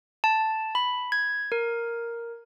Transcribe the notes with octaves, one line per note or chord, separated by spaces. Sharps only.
A5
B5
G#6
A#4